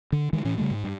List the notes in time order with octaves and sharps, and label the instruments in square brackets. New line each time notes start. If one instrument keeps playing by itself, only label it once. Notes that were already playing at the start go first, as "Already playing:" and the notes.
[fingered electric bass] D3
D#3 E3 G#3
A2 E3 C#4
C#3 G3 A3
G#2
G2